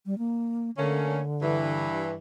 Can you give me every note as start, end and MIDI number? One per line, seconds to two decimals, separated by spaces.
0.06 0.17 55
0.18 0.71 58
0.77 1.84 50
0.77 1.20 57
0.77 1.20 58
0.77 1.20 61
1.41 2.15 43
1.41 2.15 52